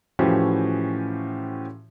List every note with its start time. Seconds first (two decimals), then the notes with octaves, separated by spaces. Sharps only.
0.19 A2 E3 F3 C#4 F#4 G4